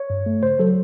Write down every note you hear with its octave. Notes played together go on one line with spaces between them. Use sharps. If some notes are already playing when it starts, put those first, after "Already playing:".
Already playing: C#5
G2
A3
C#3 C5
F#3 A4